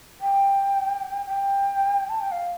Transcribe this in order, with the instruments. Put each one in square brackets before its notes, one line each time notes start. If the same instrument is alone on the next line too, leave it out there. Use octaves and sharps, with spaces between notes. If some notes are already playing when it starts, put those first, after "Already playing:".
[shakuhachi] G5
G5
A5
G5
F5